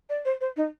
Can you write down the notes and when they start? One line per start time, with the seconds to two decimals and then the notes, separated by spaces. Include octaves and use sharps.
0.09 D5
0.25 C5
0.41 C5
0.56 D#4